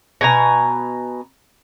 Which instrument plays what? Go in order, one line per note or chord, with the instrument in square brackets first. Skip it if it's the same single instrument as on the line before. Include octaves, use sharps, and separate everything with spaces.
[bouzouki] B2 G#5 A#5